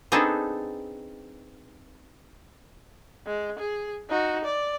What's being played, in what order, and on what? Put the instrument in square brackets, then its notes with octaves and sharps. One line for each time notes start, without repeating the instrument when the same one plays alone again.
[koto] B3 C4 D4 D#4 G#4 A4
[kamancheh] G#3
G#4
D#4 F#4
D5